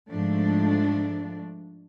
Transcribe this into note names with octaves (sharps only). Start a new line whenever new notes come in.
G#2 F3 A3 D4